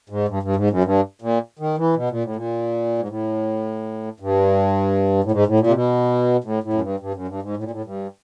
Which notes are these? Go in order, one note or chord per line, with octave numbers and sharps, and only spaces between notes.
G#2
G2
G2
G#2
F#2
G2
A#2
D#3
E3
B2
A#2
A2
A#2
G#2
A2
G2
A2
G#2
A2
A#2
C3
B2
A2
A2
F#2
G2
G2
F#2
G2
G#2
A2
A#2
A2
G2